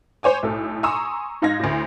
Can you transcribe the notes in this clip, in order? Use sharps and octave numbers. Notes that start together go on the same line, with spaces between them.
C5 C#5 G#5 D6
B1 A2 A4
G#5 A#5 C6 C#6 D#6 E6
G#2 D#4 F5 G#6 A#6
D2 A2